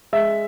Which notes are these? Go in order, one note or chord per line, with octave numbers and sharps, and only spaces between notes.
G#3 E5